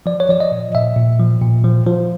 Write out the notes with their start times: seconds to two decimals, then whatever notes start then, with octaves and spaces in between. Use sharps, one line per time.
0.06 F3 D5
0.20 C#5
0.29 F3 D5
0.40 D#5
0.52 A#2
0.75 A#2 E5
0.96 A#2
1.19 F3
1.42 A#2
1.64 F3
1.87 F3